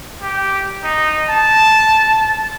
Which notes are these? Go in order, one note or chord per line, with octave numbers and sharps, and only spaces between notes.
G4
D#4
A5